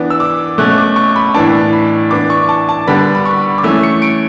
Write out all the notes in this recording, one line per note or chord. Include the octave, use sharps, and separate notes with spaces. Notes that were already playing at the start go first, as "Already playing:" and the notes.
Already playing: E3 B3 D4
E6
D6
B2 A3 C#4 F#6
D6
C#6
B5
A2 E3 B3 D4 A5
B5
E3 B3 D4 D6
C#6
A5
A5
D3 G3 B3 D4 B5
B5
C#6
D6
E3 A3 C#4 E6
C#7
D7